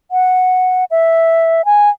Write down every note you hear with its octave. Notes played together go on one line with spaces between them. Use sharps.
F#5
E5
G#5